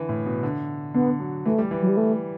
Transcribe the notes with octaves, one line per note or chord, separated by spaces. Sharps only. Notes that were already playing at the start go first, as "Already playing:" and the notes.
Already playing: D3 E3
A2
B2
D3
D3 B3
F#3
E3 A3
G3
E3
F#3
G3
A3